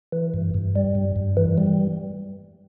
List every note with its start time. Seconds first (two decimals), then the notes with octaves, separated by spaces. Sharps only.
0.12 E3
0.34 G2
0.54 G2
0.76 G3
0.95 G2
1.16 G2
1.37 E3
1.58 G3